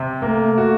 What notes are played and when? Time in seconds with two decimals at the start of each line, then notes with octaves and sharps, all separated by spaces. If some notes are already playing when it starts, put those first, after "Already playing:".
Already playing: C3
0.22 A3 A#3
0.58 F#4